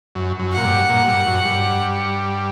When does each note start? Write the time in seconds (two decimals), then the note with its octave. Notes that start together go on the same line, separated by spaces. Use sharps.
0.15 F#2
0.39 F#2
0.53 A#2 F#5
0.65 G2
0.89 A#2
1.08 G2
1.27 F#2
1.45 G2